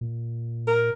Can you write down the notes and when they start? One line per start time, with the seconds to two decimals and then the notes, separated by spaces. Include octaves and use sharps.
0.01 A#2
0.68 A#4